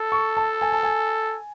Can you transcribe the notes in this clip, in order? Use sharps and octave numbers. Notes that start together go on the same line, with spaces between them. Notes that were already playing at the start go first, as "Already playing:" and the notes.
Already playing: A4
C#6
A5
G#5
A5
G#5